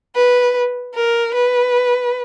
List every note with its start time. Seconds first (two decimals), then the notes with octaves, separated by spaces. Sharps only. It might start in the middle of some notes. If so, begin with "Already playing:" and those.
0.15 B4
0.95 A#4
1.35 B4